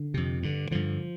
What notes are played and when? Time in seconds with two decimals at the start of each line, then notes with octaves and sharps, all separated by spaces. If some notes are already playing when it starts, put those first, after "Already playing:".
Already playing: D3
0.14 F2 C3
0.43 G2 D3
0.71 G2 D3 F3